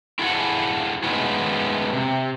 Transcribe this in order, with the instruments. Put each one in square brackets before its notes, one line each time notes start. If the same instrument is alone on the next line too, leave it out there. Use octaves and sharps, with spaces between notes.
[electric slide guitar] E4 F#4 G#4 A4 F#5
G#3 A3 B3 C#4 D#4 F#4
C3